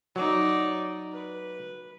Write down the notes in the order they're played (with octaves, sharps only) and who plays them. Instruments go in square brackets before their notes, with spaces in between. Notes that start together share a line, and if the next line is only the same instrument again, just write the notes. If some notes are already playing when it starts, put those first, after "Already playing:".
[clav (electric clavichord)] F#3 [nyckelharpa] D#4 D5
[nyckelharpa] B4